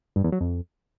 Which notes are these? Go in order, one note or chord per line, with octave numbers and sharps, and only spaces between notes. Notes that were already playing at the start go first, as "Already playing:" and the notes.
G2
E2
F#3
F2